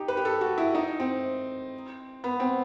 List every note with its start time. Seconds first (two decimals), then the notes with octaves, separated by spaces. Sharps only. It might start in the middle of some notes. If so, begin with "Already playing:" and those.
Already playing: D#4 G4
0.08 B4
0.17 G4
0.25 A4
0.41 F#4
0.58 E4
0.75 D#4
1.00 C4
2.24 B3
2.40 C4